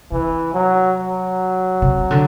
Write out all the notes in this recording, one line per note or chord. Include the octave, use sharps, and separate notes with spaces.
C3 E3
F#3
F#3
C3
D3